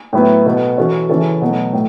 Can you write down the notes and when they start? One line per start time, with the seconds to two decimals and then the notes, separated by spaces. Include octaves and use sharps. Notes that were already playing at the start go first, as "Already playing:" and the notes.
0.13 A2 F#3 B3 E4
0.46 B2 B3 A4
0.78 E3 C#4 F#4 A4
1.09 C#3 E3 C#4 E4 A4
1.41 B2 F#3 A3
1.73 A2